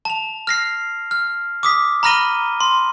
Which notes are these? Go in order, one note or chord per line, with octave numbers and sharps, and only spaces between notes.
A5 F7
F6 A#6 C7
F6
D6 D#6 B6
A#5 B5 F6 A#6 D#7 G7
C6